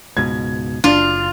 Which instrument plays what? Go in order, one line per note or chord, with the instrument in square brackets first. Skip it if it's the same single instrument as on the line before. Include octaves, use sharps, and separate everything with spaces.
[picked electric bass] C#2 G#2 B2 [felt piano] G#6
[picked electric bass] F#1 [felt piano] D4 [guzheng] F4